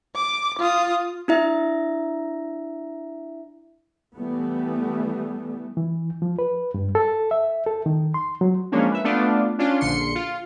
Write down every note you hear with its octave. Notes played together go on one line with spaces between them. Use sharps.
D6
F4 D#6
D4 E4 E5
E3 G3 A3 B3
E3
F3
B4
G2
A4
E5
A4
D#3
C6
F#3
F3 G#3 A#3 C#4 D4
B4 E5
A3 B3 D4 F4 D5
C#4 D4 F4
A#1 D3 C6 C#7
F4